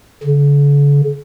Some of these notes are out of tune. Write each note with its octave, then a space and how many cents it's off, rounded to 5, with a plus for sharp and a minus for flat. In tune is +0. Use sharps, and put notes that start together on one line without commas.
D3 -45